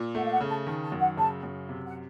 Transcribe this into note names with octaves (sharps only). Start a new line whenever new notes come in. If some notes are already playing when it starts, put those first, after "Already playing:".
Already playing: A#2
A3 F#5
F5
F#5
C#3
A5
D#3 A5
A5
F#2
F#5
C#3 A5
F#2
C3
F#5